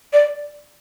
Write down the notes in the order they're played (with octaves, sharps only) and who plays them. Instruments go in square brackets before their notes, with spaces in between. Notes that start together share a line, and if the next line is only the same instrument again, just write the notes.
[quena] D5